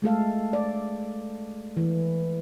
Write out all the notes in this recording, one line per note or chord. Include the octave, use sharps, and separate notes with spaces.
G#3 A3 A4 F5
D5
E3